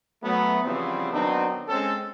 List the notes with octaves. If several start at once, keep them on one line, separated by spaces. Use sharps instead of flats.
F#3 A3 B3
C#3 E3 F3 G3 B3 C4
D#3 F#3 B3 C4 D4 D#4
G#3 C4 C#4 A4